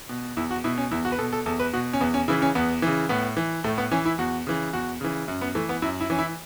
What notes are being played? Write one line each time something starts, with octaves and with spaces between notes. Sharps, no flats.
B2
E2 E4
F#4
B2 E4
C#4
E2 E4
F#4
B4
B2 A4
A4
E2 A4
B4
B2 F#4
C#4
E2 B3
C#4
C#3 E3 E4
C#4
E2 B3
C#3 E3
A2 B3
E3
A2 A3
B3
E3 C#4
E4
E2 F#4
C#3 E3
E2 F#4
C#3 E3
F#2
B3
E3 A3
B3
F#2 E4
E4
E3 C#4
E4